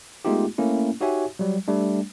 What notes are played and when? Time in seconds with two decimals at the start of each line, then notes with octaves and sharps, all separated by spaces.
0.25 G#3 A3 B3 D#4 F4 G4
0.58 A3 A#3 C#4 E4
1.01 D#4 F#4 G4 C#5 E5 G#5
1.39 F#3 G3
1.68 G3 A3 D4